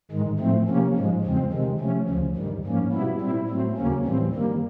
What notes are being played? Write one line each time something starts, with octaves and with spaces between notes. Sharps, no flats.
G#2 D#3 G#3
A2 F3 A3 C4
C3 F3 A#3 C#4
G#2 F3 G#3
E2 C#3 F3 G#3 C4
C3 D#3 G#3
C3 F3 A3 C#4
D2 C#3 F3
G2 D#3 G3
G#2 F3 A#3 C#4
B2 G3 B3 E4
A#2 G3 C4 E4
A2 F#3 A3 C4
D#2 C#3 F#3 A#3 C#4
A2 E3 G3 C4
G2 D#3 G3 A#3